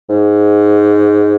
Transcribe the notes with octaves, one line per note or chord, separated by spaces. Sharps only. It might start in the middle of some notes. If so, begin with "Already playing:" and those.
G#2